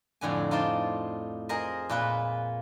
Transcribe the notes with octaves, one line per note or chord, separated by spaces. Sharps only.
F2 A2 D3 G#5
D#4 F4 C5 D5 A5
G#4 A#4 C5 D#5
A#2 F4 B4